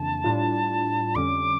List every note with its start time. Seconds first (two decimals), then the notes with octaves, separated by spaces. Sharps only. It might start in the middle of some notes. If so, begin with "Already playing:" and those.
Already playing: F2 C#3 E3 A#3 D4 A5
0.24 A2 G3 D4 F4
1.15 F2 D3 G3 C#4 D6